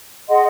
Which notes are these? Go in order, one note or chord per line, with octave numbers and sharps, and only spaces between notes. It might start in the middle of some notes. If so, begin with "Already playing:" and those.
G#4 D#5 F#5 C6